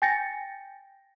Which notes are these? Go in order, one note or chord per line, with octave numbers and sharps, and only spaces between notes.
G5 G#5 G6 A6 A#6 C#7